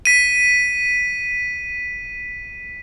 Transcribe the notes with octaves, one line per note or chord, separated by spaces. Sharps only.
B6 D#7